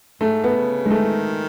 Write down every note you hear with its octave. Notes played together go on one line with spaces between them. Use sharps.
G#2 A3
B3
C#3
G#3
D#3 A3